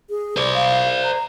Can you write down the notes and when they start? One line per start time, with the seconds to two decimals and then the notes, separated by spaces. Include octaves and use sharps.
0.10 G#4
0.37 C5 D5
0.55 F5
1.04 A#5